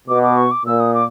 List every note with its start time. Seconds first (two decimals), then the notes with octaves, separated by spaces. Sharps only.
0.08 B2 D6
0.23 D6
0.37 C#6
0.51 D6
0.66 A#2 E6
0.80 D#6
0.94 D6